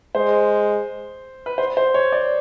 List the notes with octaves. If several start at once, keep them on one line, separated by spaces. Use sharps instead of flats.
G#3 C5
B4
C5
C5
C#5
D5